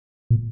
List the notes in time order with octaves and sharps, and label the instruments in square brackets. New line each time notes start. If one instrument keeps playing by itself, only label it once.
[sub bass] A#2